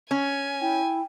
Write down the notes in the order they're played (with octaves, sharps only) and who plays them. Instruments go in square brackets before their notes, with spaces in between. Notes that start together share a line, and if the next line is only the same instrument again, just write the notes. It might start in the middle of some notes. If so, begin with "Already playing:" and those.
[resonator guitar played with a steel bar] C#4 [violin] G#5
[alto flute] E4 [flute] G5